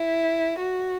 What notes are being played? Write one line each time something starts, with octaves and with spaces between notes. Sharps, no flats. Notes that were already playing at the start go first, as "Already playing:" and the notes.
Already playing: E4
F#4